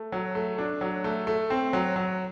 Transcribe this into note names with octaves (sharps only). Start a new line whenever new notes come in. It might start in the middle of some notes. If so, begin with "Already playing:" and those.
Already playing: A3
F#3
A3
D4
F#3
A3
A3
C4
F#3
F#3